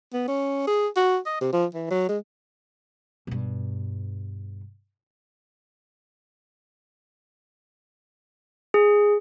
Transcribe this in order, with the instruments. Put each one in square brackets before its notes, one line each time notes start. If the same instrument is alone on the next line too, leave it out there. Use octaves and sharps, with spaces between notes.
[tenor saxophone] B3
C#4
G#4
F#4
D#5
C3
F3
E3
F#3
G#3
[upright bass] G2 B2
[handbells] G#4